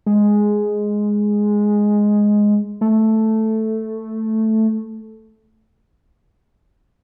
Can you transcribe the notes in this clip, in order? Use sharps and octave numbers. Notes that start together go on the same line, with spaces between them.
G#3
A3